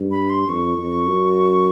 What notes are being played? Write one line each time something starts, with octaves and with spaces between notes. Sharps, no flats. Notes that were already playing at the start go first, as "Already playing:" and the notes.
Already playing: G2
B5
C6
F2 C#6
F2
F#2